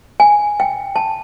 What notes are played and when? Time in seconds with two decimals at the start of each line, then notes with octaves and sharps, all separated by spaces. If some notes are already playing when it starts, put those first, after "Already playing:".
0.20 G#5
0.60 G5
0.96 A5